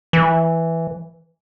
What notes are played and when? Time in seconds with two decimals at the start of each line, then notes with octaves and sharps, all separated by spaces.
0.13 E3